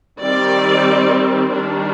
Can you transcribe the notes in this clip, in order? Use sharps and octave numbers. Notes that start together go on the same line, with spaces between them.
D#3 G3 C4 D5
D#3 G3 D4